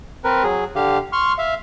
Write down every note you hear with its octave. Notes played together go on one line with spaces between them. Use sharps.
C4 A#4 B4
F#3 G#4
D3 G4 F5
C6 C#6 F6
E5 F5